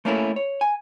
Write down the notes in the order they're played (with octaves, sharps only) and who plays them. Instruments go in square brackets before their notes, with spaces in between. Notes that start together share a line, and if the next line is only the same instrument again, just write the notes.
[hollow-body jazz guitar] A3 A#3 C#4 E4 A4 A#4
C#5
G#5